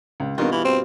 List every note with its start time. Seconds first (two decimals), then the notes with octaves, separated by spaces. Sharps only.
0.20 C#2
0.38 G2 B2 D#3 B3 F4 F#4
0.52 E3
0.65 C4